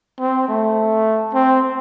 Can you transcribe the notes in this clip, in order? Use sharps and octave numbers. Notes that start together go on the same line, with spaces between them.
C4
A3
C4